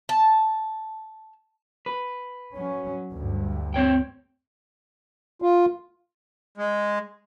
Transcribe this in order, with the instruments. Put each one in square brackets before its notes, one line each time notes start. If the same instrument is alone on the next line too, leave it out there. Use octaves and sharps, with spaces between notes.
[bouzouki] A5
[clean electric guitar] B4
[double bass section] F#3 C#4
D2 G2
[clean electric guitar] C4 C#5 G5
[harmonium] F4
[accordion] G#3